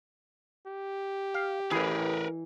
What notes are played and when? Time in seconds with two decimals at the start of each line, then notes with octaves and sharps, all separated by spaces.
0.67 G4
1.34 F5
1.71 A1 E3 G#4 A#4 B4